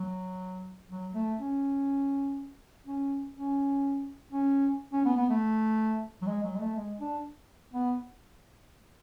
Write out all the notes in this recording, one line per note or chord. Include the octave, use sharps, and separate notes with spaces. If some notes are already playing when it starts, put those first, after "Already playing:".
Already playing: F#3
F#3
A3
C#4
C#4
C#4
C#4
C#4
B3
B3
A3
F#3
G#3
F#3
G#3
A3
G#3
D4
B3